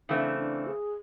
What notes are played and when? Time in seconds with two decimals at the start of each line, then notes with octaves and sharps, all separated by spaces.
0.09 C#3 E3 A3 C4 D4
0.38 D4
0.67 G#4